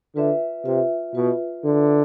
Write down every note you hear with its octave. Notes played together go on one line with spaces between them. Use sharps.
D3 F4 B4 E5
C3 F4 B4 E5
B2 F4 B4 E5
D3 F4 B4 E5